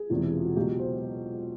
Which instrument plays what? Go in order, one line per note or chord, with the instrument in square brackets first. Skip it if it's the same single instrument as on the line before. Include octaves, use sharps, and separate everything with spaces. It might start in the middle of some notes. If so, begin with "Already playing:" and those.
Already playing: [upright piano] G#4
E1 E2 C3
E4
F4
F#4
C#2 B2 F#3 G4
C5